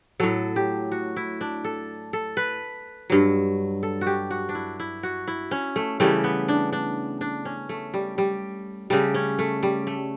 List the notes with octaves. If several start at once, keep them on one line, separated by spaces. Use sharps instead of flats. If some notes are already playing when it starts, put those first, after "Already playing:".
A2 F#3 A4
G4
F#4
E4
D4
A4
A4
B4
G2 F#3
A4
F#4
G4
F#4
D4
E4
E4
F#4
E4
C#4
A3
C#3 E3 G3 A3
B3
D4
D4
D4
C#4
A3
G3
G3
C#3 G3 A3
C#4
A3
G3
A3